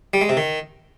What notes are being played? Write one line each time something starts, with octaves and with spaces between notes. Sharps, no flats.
G3
G#3
C3
D#3